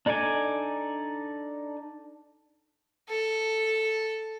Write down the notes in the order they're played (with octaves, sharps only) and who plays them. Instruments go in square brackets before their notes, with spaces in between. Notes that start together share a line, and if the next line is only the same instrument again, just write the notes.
[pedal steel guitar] D4 D#4 A4 D5 G#5
[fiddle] A4